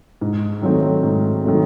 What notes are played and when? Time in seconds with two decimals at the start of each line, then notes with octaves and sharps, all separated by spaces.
0.21 G#2
0.62 D#3 F#3 A3 C4
1.03 G#2
1.44 D#3 F#3 A3 C4